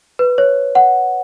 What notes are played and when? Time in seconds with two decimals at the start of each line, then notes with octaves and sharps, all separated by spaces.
0.19 B4
0.38 C#5
0.75 F#5